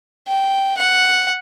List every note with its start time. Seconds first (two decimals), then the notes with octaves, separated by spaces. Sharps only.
0.28 G5
0.77 F#5